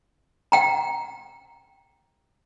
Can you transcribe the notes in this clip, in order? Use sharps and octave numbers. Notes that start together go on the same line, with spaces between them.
F#5 G5 A#5